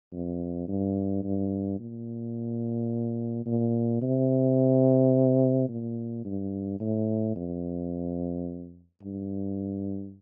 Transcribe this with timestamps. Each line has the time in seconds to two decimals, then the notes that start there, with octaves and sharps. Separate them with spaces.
0.13 F2
0.68 G2
1.23 G2
1.79 A#2
3.46 A#2
4.02 C3
5.69 A#2
6.25 G2
6.80 A2
7.36 F2
9.03 G2